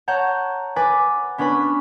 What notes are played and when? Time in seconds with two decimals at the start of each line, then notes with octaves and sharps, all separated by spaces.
0.08 C#5 F#5 A5 A#5 G6
0.76 B4 G#5 B5 D6 A6
1.38 B3 C#4 D4 B4 B5